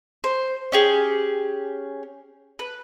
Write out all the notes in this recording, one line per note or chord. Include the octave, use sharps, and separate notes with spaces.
C5
C#4 G4 G#4
B4